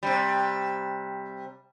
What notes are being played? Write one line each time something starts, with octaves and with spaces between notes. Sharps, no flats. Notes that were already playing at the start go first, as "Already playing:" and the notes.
C3 G3